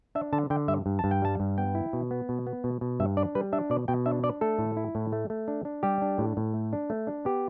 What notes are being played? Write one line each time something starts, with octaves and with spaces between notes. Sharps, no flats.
D4 E5
D3 A5
D3 G5
G2 E5
G2
G2 A5
G5
G3 A5
G2
B3 G5
E4
B2
B3
B2
B3
B2
B2
G2 E5
D4 D5
G3 B4
D4 E5
B2 D5
B2 G5
D4 E5
D4 D5
A3 A4
A2
E4
A2
A3
A3
D4
D4
G3 G4
D4
A2
A2
A3
D4
A3
D4
B3 G4